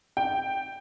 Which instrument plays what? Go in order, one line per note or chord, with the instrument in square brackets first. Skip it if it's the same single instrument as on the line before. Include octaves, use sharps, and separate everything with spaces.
[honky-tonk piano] G5